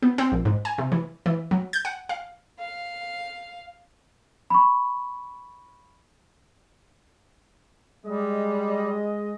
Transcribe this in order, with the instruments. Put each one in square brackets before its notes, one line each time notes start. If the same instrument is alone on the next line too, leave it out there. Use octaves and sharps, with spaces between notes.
[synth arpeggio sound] B3
C4
A#1
G#2
G#5
C3
E3
E3
F#3
G6
F#5
F5
[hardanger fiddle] F5
[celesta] B5 C#6
[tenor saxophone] G3 [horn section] G#3 D#5